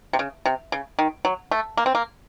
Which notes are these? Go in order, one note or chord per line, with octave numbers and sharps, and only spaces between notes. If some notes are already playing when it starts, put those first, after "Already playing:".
C3
C#3
C3
C#3
D#3
F#3
A3
A#3
C4
A#3